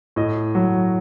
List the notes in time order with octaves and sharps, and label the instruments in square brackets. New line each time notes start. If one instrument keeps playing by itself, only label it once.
[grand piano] A2 D#5
F#3